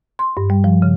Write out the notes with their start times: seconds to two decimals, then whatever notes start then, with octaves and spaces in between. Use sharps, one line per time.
0.19 C6
0.37 G2
0.50 G3
0.64 F3
0.82 C#3